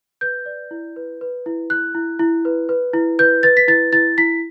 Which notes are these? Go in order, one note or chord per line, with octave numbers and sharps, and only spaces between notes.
B4 G6
D5
E4
B4
B4
E4
E4 F#6
E4
E4
B4
B4
E4
B4 G6
B4 A6
B6
E4 A6
E4 A6
E4 B6